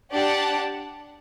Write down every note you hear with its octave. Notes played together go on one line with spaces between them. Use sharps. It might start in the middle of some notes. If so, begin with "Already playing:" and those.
D4 G4 D5 F#5 A5